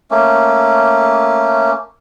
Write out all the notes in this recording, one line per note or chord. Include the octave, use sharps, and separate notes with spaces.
A3 A#3 C#4